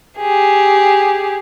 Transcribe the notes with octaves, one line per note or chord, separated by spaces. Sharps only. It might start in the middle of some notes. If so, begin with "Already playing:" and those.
G4 G#4